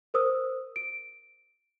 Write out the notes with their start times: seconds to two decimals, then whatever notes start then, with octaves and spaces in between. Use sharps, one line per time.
0.14 A#4 C5 D#6 E6
0.76 D7